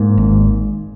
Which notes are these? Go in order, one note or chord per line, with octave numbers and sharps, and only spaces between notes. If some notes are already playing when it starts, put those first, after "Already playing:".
Already playing: G#2 A#3
G#1